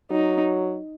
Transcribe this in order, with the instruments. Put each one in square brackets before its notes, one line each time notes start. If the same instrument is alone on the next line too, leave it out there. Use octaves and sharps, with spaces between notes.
[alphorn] F#3 [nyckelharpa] D#4